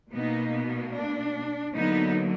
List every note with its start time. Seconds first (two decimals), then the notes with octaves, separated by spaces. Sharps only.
0.13 B2 A#3 B3 D#4
0.54 B3
0.94 D4
1.74 D3 F#3 A#3 B3 D#4